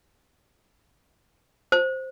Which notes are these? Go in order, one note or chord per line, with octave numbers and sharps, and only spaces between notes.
C5